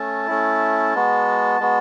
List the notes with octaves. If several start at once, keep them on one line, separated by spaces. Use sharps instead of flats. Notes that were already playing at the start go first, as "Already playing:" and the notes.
Already playing: A3 C#4 A5
A3 C#4 E4
G#3 B3 F#4
G#3 B3 F#4